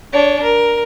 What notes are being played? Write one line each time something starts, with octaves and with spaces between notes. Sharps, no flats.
D4 C#5
A#4